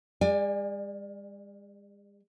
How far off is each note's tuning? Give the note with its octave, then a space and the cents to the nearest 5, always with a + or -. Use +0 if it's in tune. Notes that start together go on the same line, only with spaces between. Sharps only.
G#3 -45 D5 +20 G#5 -25